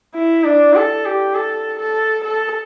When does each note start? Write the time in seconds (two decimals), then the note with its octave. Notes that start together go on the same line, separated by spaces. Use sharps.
0.15 E4
0.44 D4
0.74 A4
1.05 G4
1.34 A4
1.79 A4
2.24 A4